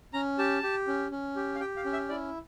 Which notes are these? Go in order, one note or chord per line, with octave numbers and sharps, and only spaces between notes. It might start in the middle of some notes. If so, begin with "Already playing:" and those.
C#4 A#5
G4 A5
G4
C#4
C#4
G4
F5
G4 G5
F5
C#4
E5
E4 D5